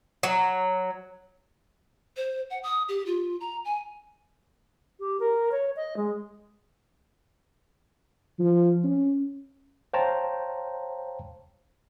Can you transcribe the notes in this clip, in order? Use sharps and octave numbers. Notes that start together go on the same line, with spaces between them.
F#3
C5
F#5
D#6
G4
F4
A#5
G#5
G4
A#4
C#5
D#5
G#3
F3
C#4
C5 C#5 F5 G5 A5 A#5